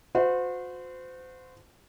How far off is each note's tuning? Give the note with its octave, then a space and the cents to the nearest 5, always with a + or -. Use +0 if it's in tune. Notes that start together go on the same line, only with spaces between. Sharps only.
F#4 -40 C5 -30